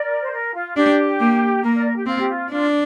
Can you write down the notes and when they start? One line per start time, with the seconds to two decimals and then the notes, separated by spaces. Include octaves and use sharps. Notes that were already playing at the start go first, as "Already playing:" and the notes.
Already playing: A#4 D5
0.20 C5
0.32 A#4
0.54 F4
0.76 D4 G4
1.20 A#3
1.63 A#3 A#4
1.74 A#4 D5
1.85 A#4
1.96 G4
2.06 C4 F4
2.18 G4
2.29 F4
2.51 D4 F4